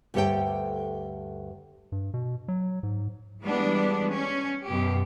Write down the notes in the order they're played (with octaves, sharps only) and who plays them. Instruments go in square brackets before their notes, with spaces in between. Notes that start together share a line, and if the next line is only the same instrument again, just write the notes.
[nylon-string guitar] D2 G2 G4 A4 C#5 G5
[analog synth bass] G2
B2
F#3
G#2
[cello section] E3 G3 G#3 B3 D4
C#4
F#2 B2 G4